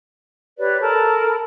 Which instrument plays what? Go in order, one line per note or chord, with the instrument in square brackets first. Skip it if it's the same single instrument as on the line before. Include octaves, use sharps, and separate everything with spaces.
[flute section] G4 B4 C#5 D5
A4 A#4 A5 B5